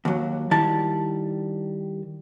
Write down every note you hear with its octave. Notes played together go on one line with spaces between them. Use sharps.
D#2 F#3
D#3 G3 E4 A5